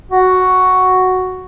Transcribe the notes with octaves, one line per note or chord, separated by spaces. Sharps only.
F#4